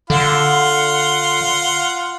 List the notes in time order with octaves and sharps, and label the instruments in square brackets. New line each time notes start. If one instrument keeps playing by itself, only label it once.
[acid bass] D3 [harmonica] F4 F#5 C6